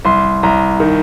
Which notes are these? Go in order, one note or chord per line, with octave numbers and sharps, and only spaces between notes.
C2 C6
C2 A#5
D#3